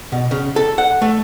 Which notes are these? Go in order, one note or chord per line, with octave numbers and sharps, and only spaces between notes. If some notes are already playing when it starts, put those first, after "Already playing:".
B2
C#3
A4
F#5
A3